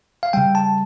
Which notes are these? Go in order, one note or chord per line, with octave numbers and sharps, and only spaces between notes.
F5
C#3 G3 G5
A5